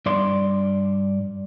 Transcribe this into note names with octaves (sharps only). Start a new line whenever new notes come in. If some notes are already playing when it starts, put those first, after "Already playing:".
G2 D5 C6